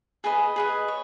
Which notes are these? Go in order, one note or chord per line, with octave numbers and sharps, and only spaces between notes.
G#4 B4 D#5 G#5
G#4 B4 D#5
C#5